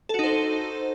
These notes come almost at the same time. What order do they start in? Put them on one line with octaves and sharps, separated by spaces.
A4 F#4 D#4 C5